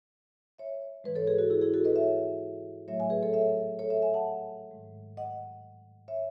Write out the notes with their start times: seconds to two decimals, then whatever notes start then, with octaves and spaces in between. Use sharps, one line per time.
0.59 C#5 E5
1.04 G#2 E3 G#3 B4
1.15 A4 C#5
1.27 G#4 B4
1.38 F#4 A4
1.50 E4 G#4
1.61 E4 G#4
1.74 F#4 A4
1.85 B4 D#5
1.96 C#5 E5
2.88 A2 F#3 A3 C#5 E5
3.00 E5 G#5
3.10 G#4 B4
3.23 A4 C#5
3.33 C#5 E5
3.79 A4 C#5
3.90 C#5 E5
4.02 E5 G#5
4.14 F#5 A5
4.71 G#2 D#3 G#3
5.17 D#5 F#5
6.08 C#5 E5